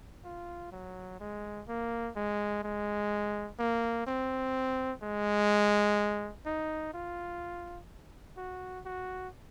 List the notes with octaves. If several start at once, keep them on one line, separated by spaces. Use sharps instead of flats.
F4
F#3
G#3
A#3
G#3
G#3
A#3
C4
G#3
D#4
F4
F#4
F#4